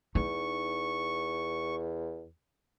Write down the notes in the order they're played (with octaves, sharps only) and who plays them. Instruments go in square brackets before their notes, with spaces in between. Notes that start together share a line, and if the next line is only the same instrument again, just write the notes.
[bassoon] E2 [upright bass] D#4 [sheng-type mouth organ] C#6